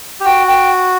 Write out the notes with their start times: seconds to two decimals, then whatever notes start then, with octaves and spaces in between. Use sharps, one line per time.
0.20 G4
0.25 F#4 G5
0.47 G5